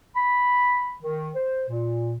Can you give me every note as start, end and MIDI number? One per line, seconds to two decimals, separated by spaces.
0.16 0.94 83
1.03 1.29 51
1.35 1.64 72
1.69 2.16 46